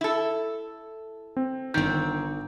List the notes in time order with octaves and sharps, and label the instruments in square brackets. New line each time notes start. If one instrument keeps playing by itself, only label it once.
[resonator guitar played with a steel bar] E4 A4
[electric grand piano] C4
[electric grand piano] G1 G6 [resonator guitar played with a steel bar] D#3 C4